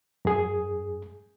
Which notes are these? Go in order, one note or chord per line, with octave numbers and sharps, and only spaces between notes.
F#2 G#4